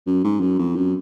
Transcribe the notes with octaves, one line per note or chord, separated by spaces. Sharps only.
F#2
G#2
F#2
F2
F#2